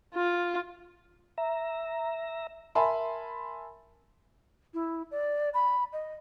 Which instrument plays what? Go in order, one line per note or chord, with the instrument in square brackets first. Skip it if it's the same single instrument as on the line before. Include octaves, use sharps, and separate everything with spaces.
[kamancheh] F4
[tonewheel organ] E5 A#5
[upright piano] A#4 E5 G#5 A5 B5 C6
[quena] E4
D5
B5
D#5